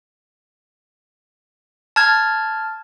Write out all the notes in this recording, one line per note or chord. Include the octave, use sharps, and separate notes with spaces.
A5 F6 G#6